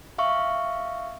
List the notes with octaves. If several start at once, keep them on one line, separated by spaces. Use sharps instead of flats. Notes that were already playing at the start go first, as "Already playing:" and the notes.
E5 F5 C#6